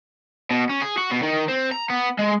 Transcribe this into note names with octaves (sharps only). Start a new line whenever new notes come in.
B2
C#4
G#4
F#4
B2
D#3
C4
A#5
B3
G#3